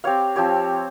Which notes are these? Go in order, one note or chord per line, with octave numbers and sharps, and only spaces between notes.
C4 G4 C#5 F5
F3 C4 G4 C#5